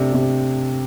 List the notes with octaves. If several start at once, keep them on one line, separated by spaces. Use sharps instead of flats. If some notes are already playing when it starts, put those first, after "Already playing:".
Already playing: C3 A3 D4
C3